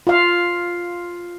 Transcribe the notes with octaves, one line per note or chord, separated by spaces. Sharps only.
F4 F5